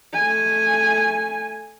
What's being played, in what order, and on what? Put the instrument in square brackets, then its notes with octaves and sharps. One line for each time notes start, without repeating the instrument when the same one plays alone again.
[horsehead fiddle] A3 G#5